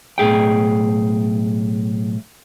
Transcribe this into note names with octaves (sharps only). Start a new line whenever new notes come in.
B1 A2 G#4 G5